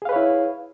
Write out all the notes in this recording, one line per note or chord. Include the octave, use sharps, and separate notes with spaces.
E4 G#4 B4 C#5 F5